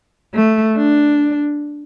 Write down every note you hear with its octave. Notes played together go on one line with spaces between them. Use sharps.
A3
D4